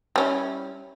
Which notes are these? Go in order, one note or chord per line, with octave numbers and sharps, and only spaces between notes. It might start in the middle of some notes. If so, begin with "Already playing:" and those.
G3 C#4 E4